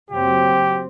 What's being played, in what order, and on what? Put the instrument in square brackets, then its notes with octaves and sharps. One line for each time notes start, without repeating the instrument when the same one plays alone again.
[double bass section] F#1 F#3 C4 [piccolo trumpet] G4